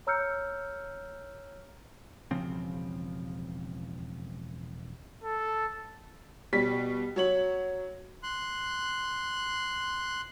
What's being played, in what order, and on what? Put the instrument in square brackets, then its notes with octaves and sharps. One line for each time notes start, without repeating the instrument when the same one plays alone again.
[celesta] C#5 A#5 E6 F6 G6 C#7
[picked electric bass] E1 C#3 F3 C4
[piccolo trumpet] A4
[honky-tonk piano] B2 G3 B6
F#3 C#5 F#7
[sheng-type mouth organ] C6 F#6